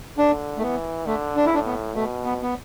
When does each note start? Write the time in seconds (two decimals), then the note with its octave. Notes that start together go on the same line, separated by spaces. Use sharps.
0.18 D3 D4
0.58 A3
0.62 E3 B3
1.06 D3 A3
1.36 D4
1.46 E4
1.52 A2 D4
1.66 B3
1.95 B2 A3
2.25 B3
2.42 B3